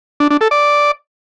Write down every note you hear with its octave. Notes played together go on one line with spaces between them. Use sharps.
D4
D4
A4
D5